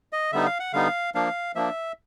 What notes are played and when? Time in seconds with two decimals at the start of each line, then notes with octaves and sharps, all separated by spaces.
0.13 D#5
0.32 D3 G3 B3 D#4 E5
0.46 F5
0.60 F#5
0.73 D3 G3 B3 D#4 F5
1.15 F3 A#3 D4 F5
1.55 F3 A#3 D4 E5